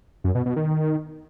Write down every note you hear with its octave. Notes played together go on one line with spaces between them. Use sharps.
F#2
B2
B2
D#3